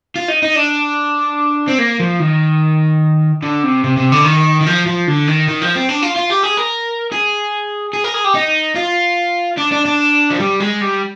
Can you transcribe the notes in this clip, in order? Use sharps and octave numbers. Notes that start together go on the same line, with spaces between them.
F4
D#4
D#4
D4
C4
A#3
F3
D#3
D3
C3
C3
C3
D3
D#3
D#3
F3
F3
D3
D#3
D#3
F3
C4
D4
F4
F4
G4
G#4
A#4
G#4
G#4
A#4
G#4
G4
D#4
F4
D4
D4
D4
F3
G3
G#3
G3